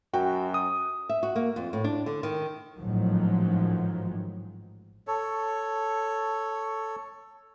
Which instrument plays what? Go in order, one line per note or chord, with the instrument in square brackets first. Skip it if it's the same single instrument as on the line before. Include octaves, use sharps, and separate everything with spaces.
[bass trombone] F#2 [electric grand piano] F#4 [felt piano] G5
[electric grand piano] D#6
[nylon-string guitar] E5
F#4
A#3
F2
A2
D4
D3
D#3
[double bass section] A1 G#2 D#3 F3 F#3
[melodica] A4 C#5